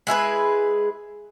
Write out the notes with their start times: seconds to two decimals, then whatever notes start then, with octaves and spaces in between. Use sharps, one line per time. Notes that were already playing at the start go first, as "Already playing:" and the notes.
0.07 G#3 E4 G#4 B4